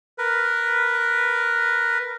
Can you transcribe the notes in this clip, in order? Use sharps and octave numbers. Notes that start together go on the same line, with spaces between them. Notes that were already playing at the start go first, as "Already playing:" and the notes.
A#4 B4